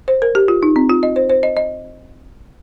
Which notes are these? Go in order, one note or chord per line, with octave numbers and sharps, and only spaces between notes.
C5
A#4
G4
F4
D#4
C4
F4
D#5
C5
C5
D#5
D#5